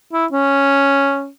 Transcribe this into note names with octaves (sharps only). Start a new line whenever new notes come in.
E4
C#4